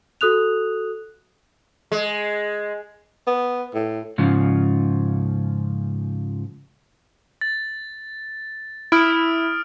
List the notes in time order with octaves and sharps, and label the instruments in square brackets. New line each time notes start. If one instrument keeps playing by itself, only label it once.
[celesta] F#4 A4 D#6 F#6 F7
[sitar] G#3
[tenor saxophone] B3
A2
[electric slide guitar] G#2 C#3 F3
[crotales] A6
[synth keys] E4 [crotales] D#6 F6 D7